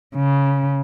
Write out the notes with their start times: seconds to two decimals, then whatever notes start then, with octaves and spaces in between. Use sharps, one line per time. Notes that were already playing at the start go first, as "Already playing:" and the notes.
0.16 C#3